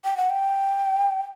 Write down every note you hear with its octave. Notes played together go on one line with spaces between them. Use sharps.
G5
F#5
G5